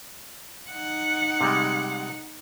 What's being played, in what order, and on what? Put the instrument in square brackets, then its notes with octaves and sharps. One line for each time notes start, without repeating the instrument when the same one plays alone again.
[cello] D#4 F#5
[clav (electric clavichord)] C3 G3 G#3